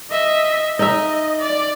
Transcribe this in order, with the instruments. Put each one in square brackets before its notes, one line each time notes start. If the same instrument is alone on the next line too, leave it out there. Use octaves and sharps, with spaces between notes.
[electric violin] D#5 E5
[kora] D#4 E5 [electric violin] D#5
[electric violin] D5